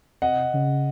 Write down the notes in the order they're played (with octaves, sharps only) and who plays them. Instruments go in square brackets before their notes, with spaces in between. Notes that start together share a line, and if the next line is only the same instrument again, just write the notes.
[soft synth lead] C3 [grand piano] D#5 F#5
[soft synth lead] C#3